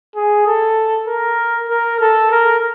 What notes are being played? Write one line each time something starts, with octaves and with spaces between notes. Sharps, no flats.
G#4
A4
A#4
A#4
A4
A#4